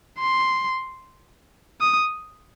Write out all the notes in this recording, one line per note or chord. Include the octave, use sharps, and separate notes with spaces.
C6
D#6